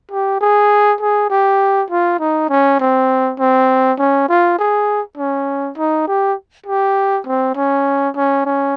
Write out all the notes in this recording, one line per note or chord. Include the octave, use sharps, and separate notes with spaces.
G4
G#4
G#4
G4
F4
D#4
C#4
C4
C4
C#4
F4
G#4
C#4
D#4
G4
G4
C4
C#4
C#4
C#4